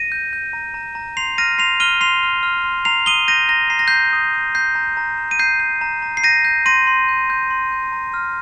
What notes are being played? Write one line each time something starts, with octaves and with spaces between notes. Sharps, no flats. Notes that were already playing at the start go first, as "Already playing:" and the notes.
Already playing: A#6 D#7
G6
G6
A#5
A#5
A#5
C6 C7 F7
F6 A#6 D#7
C6 C7 F7
F6 D#7 G7
C6 C7 F7
F6
F6
C6
A#5 C7 F7
D#6 D#7 G7
G6 A#6 D#7
A#5 A#6
A#5 C7
A#6
A#5 G6 C7
D#6
D#6
A#5 G6 C7
A#5
A#5
A#5
D#7
A#5 G6 C7
G6
A#5
A#5
C7
G6 A#6 D#7
G6
C6 A#6 D#7
C6
G6
G6
C6
G6
A#5
F6